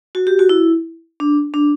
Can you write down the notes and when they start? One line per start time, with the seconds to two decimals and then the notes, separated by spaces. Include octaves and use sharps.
0.15 F#4
0.27 G4
0.39 F#4
0.49 E4
1.20 D4
1.54 D4